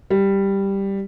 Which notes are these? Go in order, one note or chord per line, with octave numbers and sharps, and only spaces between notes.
G3